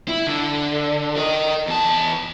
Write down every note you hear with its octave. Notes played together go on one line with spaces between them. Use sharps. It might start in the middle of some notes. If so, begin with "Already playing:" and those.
E4
D3
A#4 D#5
E2 A5